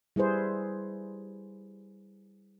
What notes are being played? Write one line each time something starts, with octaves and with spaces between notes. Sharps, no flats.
G3 E4 G#4 B4 C5